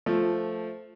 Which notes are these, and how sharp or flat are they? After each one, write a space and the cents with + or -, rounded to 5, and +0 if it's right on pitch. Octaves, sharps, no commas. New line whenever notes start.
F3 +0 A3 +0